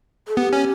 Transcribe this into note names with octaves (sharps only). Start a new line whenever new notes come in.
A4
B3 G4
C#4